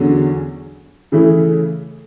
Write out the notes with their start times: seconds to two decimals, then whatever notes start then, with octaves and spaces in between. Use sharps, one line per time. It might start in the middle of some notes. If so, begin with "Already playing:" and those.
Already playing: E2 D3 F#3 C#4 G#4
1.12 C#3 E3 A3 E4